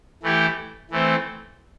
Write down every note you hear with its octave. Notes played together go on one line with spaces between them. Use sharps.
E3 A3 E4 G4
E3 A3 C4